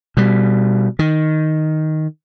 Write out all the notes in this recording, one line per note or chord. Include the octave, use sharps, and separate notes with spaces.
B2 G3
D#3